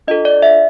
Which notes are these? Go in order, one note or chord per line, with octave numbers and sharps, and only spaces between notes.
D4 F4 A4 D#5
D5
E5